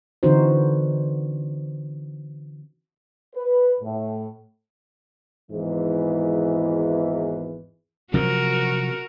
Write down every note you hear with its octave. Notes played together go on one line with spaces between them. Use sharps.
D3 E3 C4 D#4 F#4 C5
B4
A2
G#1 E2 G#2 E3
C3 F3 F#3 F#4 A#4